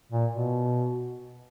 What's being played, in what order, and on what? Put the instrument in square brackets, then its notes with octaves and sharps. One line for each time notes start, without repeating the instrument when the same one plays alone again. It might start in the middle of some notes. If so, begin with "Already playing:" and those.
[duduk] A#2
B2